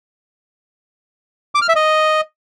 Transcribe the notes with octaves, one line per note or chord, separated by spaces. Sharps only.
D6
F6
E5
D#5